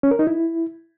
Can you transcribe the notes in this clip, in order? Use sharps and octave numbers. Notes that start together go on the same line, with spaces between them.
C#4
A#4
D#4
E4